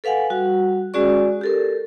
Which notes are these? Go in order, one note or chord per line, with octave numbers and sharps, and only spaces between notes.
A4 B4 F5 F#5 G#5
G3 F#4 F#5
G#3 C#4 F#4 G#4 D5 C#6
G4 A4 A#4